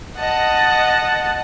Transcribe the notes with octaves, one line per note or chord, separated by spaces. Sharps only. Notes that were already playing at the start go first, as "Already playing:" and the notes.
D#5 F#5 A5